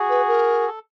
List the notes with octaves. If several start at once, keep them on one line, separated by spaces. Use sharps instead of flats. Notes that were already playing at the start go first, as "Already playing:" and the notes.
Already playing: F#4 G#4
B4
A#4
A4